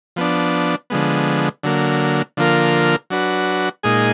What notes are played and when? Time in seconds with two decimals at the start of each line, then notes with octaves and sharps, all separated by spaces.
0.16 F3 B3 D4
0.90 D3 F3 G#3 B3
1.63 D3 F#3 A#3
2.37 D3 F3 A#3 F4 A#4
3.10 F#3 D4 F#4 B4
3.83 A#2 G#3 D#4 G#4